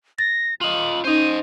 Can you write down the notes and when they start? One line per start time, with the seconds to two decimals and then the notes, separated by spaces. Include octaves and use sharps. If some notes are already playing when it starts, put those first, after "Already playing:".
0.19 A6 A#6
0.61 F4 D#5 F#7
1.05 C#4 D#4 C5 D#5 D#7